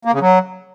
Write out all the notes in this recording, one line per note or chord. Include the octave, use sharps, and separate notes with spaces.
A#3
C#3
F#3